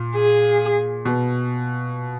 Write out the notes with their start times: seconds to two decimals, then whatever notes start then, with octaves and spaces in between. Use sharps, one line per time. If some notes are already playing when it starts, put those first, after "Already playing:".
Already playing: A#2
0.16 G#4
1.05 B2